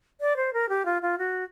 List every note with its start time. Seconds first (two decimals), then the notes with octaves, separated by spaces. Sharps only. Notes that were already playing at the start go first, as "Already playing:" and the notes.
0.21 D5
0.36 C5
0.53 A#4
0.69 G4
0.85 F4
1.02 F4
1.18 F#4